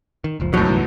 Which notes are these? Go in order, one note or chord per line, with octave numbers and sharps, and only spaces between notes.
D#3
F#1 C#2 F3
B1 F#2 A2 F#3
C2 G2 E3